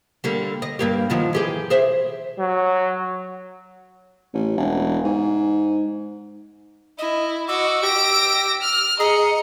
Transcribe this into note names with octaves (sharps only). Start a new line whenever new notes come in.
D3 G3 A#3
D#5
G2 A#3 G4
D#3 F3 F#3
E3 G4 G#4
G#4 C5 E5
F#3
A1
E1
G#2
E4 D#5
F#4 D#5 D6 E6
G4 A#6 D7
F6
G#4 D#5 A#5 C#7